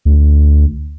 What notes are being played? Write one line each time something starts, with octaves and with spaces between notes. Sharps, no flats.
D2